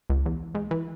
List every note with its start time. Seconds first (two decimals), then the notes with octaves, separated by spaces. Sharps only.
0.10 C#2
0.26 E2
0.55 G#2
0.71 E3